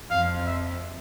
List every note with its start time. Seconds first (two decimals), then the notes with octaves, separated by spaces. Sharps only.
0.11 F2 F5
0.46 E5